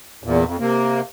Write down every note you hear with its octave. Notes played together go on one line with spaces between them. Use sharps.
E2 A#2
F2
C3 A#3